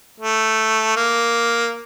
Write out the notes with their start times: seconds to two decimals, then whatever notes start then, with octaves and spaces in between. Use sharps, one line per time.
0.20 A3
0.96 A#3